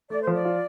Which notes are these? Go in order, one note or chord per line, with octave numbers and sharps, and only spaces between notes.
A3 D5
C5
F3 D5
F4